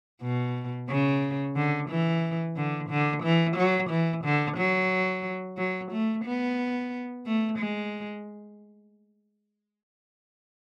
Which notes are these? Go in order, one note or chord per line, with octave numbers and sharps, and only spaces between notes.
B2
C#3
D3
E3
D3
D3
E3
F#3
E3
D3
F#3
F#3
A3
B3
A3
G#3